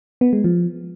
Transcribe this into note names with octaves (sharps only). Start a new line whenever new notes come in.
B3
G#3
F3